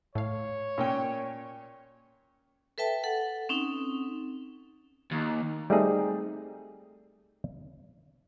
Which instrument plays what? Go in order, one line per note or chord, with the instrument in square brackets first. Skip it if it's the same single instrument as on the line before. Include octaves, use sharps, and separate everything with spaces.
[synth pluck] A2 F5 [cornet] C#5
[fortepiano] A#2 C#4 G5
[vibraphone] A4 B4 E5 G5 A5
A4 F#5
C4 C#4 D#4
[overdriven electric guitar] D#2
[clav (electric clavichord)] G3 A3 C4 D#4 G#4